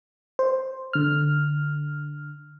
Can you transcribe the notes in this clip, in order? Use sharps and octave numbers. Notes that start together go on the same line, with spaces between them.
C5
D3 F6